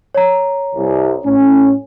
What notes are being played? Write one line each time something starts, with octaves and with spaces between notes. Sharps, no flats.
C#5 A#5
C2
A2 C#4